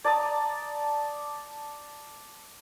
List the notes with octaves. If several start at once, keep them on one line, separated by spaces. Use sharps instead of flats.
D5 A5 A#5 D#6